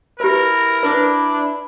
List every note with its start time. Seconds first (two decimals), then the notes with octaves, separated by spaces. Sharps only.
0.20 E4 G4 A#4 B4
0.83 D4 B4